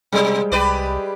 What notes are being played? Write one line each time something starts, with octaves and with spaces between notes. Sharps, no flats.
B2 G3 G#3
C2 G4 B4 D5